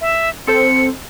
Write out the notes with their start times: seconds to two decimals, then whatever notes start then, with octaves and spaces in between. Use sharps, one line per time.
0.01 E5
0.47 C4 A4 C5 C#7